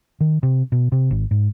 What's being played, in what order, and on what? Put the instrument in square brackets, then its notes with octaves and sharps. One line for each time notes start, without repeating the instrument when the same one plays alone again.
[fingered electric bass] D#3
C3
B2
C3
G#1
G#2